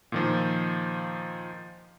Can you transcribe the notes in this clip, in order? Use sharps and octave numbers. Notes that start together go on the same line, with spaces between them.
A#2 D#3 F3